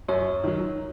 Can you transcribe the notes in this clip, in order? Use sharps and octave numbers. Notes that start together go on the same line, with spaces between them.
F#2 C#5
D#3 F#3